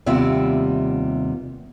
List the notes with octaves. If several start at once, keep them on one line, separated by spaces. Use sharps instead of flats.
D#2 C3 G3 B3 F4 E5